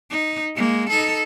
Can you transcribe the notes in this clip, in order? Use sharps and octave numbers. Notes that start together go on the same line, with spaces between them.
D#4
G#3 A#3
D#4 A4